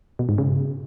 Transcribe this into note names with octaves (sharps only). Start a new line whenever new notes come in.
B2
G#2
C#3